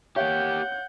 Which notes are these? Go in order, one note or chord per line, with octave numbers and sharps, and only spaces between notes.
A#3 G4 C#5 F5 F#5 G6